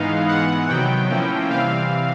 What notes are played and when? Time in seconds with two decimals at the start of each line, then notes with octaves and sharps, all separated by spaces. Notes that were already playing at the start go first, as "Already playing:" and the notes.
Already playing: G#2 E3 G#3 B3 D#4 F5
0.28 G#2 E3 G#3 B3 F#5
0.69 C3 D#3 F#3 B3 G5
1.10 A2 F3 A#3 C#4 E4
1.49 C3 E3 G3 C4 F5